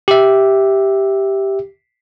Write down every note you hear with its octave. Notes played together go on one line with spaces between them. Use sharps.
G4 E5